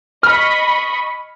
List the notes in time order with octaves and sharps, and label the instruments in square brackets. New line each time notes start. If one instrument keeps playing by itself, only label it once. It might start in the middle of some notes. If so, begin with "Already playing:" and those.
[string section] D#5 B5 C#6 [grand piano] F6